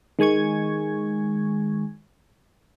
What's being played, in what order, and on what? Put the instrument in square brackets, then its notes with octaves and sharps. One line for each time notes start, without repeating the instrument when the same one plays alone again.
[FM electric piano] D#3 G#3 G#5 C#6 G#6